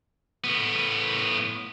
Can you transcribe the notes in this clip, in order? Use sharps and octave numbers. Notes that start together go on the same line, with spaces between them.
A2 B3